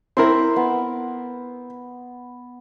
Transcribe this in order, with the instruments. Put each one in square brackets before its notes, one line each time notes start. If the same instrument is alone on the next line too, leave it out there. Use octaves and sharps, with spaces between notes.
[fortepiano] C4 E4 A#4 [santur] C6
[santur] B3